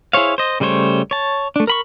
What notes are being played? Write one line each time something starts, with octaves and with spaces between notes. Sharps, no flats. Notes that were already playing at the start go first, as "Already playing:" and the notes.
E4 G#4 C5 C#5 F5
C5 D#5
C#3 G3 A3 C5 C#5
C#5 A5
A3 D4
A#4 B5 C#6